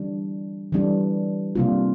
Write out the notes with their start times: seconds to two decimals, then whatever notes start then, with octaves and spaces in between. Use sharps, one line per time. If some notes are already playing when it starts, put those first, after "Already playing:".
Already playing: E3 G3 D4
0.72 E3 G3 D4
1.55 C3 G3 A#3 D4 F4